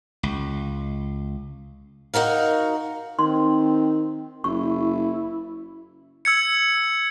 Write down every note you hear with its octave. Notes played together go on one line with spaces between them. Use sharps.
C#2
D#4 F#4 A#4 F5
D#3 C4 C6
F#1 E4 C#6
E6 G#6 C#7